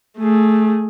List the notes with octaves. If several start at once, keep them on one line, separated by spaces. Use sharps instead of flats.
A3 G#4